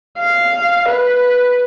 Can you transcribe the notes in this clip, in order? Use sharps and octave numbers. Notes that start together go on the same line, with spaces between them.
F5
B4